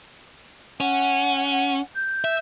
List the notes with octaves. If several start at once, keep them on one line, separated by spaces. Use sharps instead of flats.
C#4 F#5
G6
E5